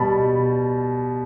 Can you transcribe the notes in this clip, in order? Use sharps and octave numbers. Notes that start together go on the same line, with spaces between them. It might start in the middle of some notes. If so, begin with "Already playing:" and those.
Already playing: B2 G3 A5 B5